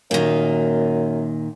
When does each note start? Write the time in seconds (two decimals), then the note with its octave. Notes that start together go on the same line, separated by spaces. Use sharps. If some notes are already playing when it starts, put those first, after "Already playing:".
0.11 F#2 A#2 D#3